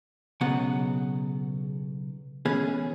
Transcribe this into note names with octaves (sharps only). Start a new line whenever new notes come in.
B1 C#3 F#3 B3 F#5
E3 B3 C#4 G#4